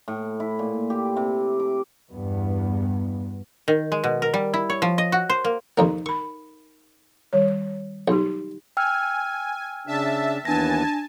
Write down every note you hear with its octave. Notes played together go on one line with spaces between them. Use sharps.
A2
E4
A#2
G4
C3
D6
E2 G2 B3
D#3
G#3
B2
A#4
G3
E4
C#5
F3
D#5
F#4
C5
A#3
C2 F2 A#3 D#4 A#5
A#4 B5 C#6
D#3 G3 C#5
B1 D#4 G4
G5 G#5 E6 F6
C#3 D4 E5 A5
D#2 E3 B3 D4 G#5 A5 A#6